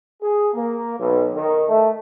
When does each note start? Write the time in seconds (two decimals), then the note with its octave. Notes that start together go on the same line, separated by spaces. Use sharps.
0.22 G#4
0.53 A#3
0.98 B1
1.35 D#3
1.68 A3